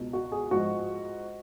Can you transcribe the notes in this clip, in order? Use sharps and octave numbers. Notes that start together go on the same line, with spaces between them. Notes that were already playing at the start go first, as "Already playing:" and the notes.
Already playing: C#2 B2
F#4
G#4
G#2 F3 F#4